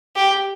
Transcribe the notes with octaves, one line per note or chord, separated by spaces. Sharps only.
G4